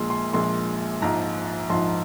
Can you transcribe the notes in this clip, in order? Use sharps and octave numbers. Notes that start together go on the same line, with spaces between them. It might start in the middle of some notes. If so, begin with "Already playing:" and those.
Already playing: A#1 A#2 G#3 C6
C6
A#1 A#2 G#3 C6
A#1 G#2 F3 A#5
A#1 G#2 F3 C6